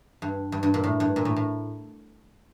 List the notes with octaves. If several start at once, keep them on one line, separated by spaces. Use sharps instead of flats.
G2
G2
G2
A#2
A2
G2
A#2
A2
A2